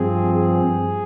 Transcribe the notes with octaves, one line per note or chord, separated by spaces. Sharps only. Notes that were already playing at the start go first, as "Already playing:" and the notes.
Already playing: G2 F3 C4 G#4
G#4